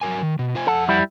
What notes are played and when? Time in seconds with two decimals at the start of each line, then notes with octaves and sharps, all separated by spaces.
0.01 F#3 A#4 G#5
0.23 D#3
0.39 B2
0.55 F4 C5 G#5
0.67 F2 A4 F#5
0.89 G3 E4